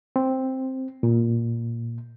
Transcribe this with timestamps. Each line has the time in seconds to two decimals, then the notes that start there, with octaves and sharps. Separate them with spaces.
0.16 C4
1.03 A#2